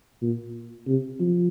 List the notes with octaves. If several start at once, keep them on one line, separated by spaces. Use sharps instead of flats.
A#2
C3
F3